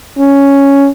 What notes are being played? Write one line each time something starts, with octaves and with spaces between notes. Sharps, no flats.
C#4